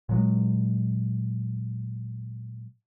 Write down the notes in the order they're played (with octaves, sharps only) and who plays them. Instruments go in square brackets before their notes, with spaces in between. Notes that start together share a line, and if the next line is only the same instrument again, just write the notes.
[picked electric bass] A#2 F#3 G#3